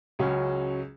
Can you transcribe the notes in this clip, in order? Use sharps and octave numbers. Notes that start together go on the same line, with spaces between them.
C#2 C#3 F#3 C#4